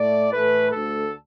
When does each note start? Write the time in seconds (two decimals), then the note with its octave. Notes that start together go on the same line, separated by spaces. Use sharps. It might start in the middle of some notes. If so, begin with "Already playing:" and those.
Already playing: A2 A3 D5
0.32 A2 E3 A3 B4
0.71 D2 D3 A3 A4